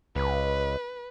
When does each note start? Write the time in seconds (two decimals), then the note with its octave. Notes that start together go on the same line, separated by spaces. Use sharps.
0.15 C#2 B4